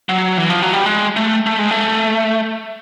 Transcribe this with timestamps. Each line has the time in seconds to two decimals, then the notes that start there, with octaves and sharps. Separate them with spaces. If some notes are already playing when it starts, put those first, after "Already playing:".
0.09 F#3
0.38 E3
0.50 F3
0.62 F#3
0.73 G3
0.86 G#3
1.16 A3
1.47 A3
1.59 G#3
1.71 A3